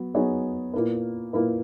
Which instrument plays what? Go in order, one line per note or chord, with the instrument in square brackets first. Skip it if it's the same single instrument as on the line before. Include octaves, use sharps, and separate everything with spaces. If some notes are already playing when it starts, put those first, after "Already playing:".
Already playing: [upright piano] F#3 B3
F#3 B3 D#4 G#4 C#5
A#2 A#3 E4 B4
A#2 A#3 E4 B4